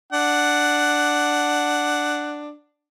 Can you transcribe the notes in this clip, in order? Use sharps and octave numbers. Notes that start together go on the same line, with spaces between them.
D4 F#5